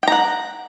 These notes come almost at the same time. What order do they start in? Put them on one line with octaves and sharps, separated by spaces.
G5 A#5 F#5